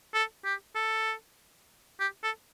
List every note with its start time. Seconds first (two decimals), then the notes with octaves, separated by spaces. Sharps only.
0.14 A4
0.45 G4
0.75 A4
2.00 G4
2.23 A4